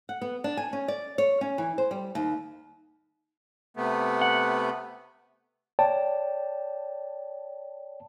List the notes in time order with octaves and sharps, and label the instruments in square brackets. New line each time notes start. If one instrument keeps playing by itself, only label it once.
[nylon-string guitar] F#5
B3
D4
G#5
C#4
D5
C#5
C#4
E3
C5
G3
D#2
[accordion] C3 A3 B3
[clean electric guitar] F#5
[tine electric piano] C#5 D5 G5 A5